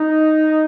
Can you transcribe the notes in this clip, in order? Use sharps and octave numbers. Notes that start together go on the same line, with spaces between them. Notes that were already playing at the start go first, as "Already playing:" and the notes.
Already playing: D#4